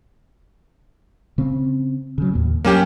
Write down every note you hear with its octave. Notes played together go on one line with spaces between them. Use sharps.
C#3 C4
C#3 F#3
D#2 A2 A#3
G2 F#3 A#3 C#4 G4